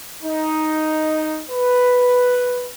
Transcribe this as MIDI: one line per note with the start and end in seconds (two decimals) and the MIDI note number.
0.24 1.41 63
1.50 2.68 71